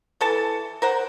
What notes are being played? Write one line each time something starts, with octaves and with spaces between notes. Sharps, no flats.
E3 A4 A5
A#4 C5 F#5